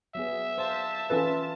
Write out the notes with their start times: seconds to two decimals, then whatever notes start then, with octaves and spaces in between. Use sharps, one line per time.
0.15 F#3 B3 G#4 E5
0.58 C5 F5 A5
1.10 E3 C#4 E4 F4 A4 B4